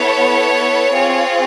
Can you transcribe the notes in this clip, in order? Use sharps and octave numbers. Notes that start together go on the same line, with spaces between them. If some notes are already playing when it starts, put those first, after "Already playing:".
Already playing: B3 E4 A4 C#5
C4 F4 G#4